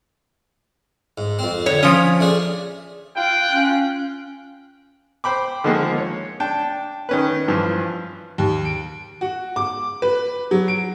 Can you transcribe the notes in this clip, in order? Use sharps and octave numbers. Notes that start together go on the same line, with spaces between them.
G#2
F2 C4
D3 C#5
F3 C#4 B5 D#6
A3 D4 G#4
F4 G5 F#6
C#4
C5 G5 B5 D6
D3 D#3 F3 G#3 A#3
C#5
D4 G5 A5
D#3 C#4 B4
G2 E3 F3
D#2
D7
F#4
D6
B4
F#3
D7